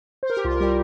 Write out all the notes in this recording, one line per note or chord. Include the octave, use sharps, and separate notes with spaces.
C5
A#4
G4
C2 F4
A#4
G3 G4